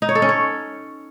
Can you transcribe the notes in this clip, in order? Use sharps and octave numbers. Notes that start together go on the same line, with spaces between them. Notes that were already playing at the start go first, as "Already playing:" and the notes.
D#4
C#5
A4
C#4
C#5